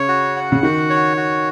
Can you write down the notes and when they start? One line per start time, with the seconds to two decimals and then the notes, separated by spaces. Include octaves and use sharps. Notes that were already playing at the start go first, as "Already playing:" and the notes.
Already playing: C#3 C#5
0.08 F#4
0.36 F#5
0.52 C#3
0.63 D#3 F#4
0.90 C#5
1.17 F#4